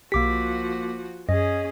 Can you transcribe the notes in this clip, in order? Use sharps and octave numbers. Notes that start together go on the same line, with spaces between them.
B1 F3 A#3 F#4 G4 D6 B6
F#2 C#4 G#4 D#5